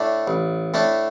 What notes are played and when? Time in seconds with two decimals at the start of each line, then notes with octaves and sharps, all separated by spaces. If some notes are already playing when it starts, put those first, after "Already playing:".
Already playing: A2 A3 D4 D5
0.28 A1
0.74 A2 A3 D4